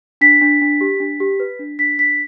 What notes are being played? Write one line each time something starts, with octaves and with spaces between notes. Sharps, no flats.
D4 B6
D4
D4
G4
D4
G4
B4
D4
D4 B6
D4 B6